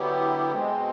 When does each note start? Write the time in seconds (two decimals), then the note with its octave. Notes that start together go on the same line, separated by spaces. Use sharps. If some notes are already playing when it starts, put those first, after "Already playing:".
Already playing: D3 F#3 B3 E4 G4
0.51 B2 G#3 C4